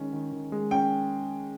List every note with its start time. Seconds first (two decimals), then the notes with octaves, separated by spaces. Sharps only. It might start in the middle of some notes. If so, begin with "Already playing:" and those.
Already playing: D#3 G#3 C#4
0.13 D#3
0.33 D#3
0.52 G#3
0.71 C#4 G5